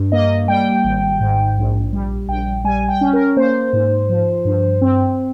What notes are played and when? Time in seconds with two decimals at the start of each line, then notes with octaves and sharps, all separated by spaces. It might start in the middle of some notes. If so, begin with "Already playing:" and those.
Already playing: G2
0.12 A#3 D#5
0.48 G3 G5
0.84 G#1
1.20 G#2
1.57 A#1
1.93 G3
2.28 A#1 G5
2.64 G3 G#5
2.89 G5
3.01 C#4
3.13 A#4
3.37 A#3 C5
3.73 G#2
4.09 F3
4.45 G2
4.82 C4